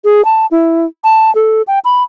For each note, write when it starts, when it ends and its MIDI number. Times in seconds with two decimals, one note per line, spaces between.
0.04 0.24 68
0.25 0.46 81
0.51 0.86 64
1.04 1.33 81
1.35 1.62 69
1.67 1.79 79
1.85 2.03 83